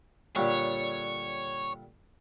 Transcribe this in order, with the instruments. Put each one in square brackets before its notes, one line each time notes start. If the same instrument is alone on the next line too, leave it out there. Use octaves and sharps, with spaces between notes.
[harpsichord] A#2 D3 G3 [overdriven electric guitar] C#5